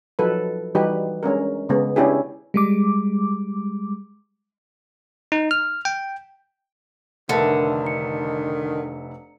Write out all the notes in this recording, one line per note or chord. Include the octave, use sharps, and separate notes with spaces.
F3 F#3 D#4 A4 B4
E3 G3 D#4 F#4 G4 B4
G#3 C#4 D4 A#4
C#3 G#3 B3
C#4 D4 E4 G4 G#4
G3 G#3 D6
D#4
F6
G5
F1 D3 D#3 A#4 B4 E5 A5 C#7
A#5 C#7